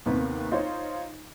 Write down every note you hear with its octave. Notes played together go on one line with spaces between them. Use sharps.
D#2 C3 D#3 B3 C4
D#4 F4 C5 C#5